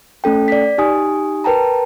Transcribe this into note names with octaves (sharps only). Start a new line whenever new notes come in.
A3 C#4 A4 G5
D5 B6
D#4 G4 G#5 D#6
A#4 B4 G5 A5 A#5